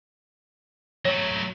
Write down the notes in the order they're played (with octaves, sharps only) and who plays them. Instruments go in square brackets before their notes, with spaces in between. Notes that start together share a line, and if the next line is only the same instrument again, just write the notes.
[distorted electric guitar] F#3 A3 [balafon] C#5